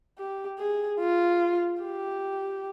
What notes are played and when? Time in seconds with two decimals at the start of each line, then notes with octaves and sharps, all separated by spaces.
0.18 G4
0.59 G#4
1.00 F4
1.81 G4